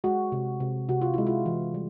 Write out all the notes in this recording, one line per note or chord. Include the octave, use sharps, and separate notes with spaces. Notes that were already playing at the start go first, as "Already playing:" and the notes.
G#3 F#4
C3
C3
C3 F#4
F4
G#3 E4
F4
E3
G3